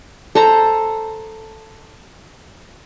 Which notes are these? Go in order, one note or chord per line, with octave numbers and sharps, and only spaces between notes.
A4 C5 A5 A#5